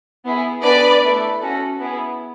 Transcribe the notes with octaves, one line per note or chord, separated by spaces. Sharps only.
B3 E4 G#4
B3 D4 G#4 B4 D5
A3 E4 A4
C#4 F#4 A4
B3 E4 G#4